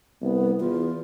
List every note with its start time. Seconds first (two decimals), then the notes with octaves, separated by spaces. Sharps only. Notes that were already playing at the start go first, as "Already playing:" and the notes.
0.21 C2 B3
0.60 E2 F4